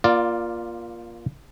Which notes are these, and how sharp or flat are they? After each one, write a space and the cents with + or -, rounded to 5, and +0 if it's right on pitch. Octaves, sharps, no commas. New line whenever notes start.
A#3 +25 F4 -5 D5 +0